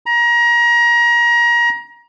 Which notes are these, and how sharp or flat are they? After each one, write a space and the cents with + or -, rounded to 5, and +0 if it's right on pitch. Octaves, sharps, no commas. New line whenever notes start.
A#5 +30